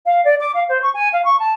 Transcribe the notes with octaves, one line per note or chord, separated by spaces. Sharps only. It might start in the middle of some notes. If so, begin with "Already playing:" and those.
F5
D5
D6
F5
C5
C#6
G#5
F5
C#6
A5